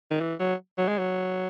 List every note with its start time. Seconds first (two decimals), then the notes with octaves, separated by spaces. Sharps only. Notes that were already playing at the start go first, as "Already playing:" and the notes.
0.11 D#3
0.21 E3
0.40 F#3
0.78 F#3
0.88 G#3
0.98 F#3